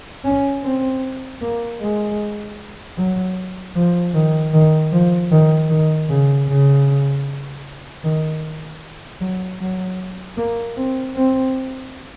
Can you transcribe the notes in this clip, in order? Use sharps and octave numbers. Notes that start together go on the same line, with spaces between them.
C#4
C4
A#3
G#3
F#3
F3
D#3
D#3
F3
D#3
D#3
C#3
C#3
D#3
F#3
F#3
A#3
C4
C4